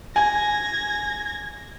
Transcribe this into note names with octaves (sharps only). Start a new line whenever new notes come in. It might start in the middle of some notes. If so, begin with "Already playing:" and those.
G#5 G#6 A#6